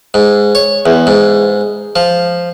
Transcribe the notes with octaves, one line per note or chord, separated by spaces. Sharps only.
G#2
C#5
E2
G#2
F3